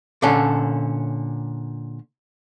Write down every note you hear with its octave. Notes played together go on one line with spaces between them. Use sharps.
A#2 D3 C#4 A4